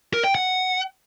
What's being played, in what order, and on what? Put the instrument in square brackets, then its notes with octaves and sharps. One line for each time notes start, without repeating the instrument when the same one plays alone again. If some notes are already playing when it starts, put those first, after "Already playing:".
[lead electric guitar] A#4
G5
F#5